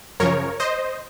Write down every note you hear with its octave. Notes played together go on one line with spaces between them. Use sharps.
F#2 C#3 F3 A#4 C#5
C5 D#5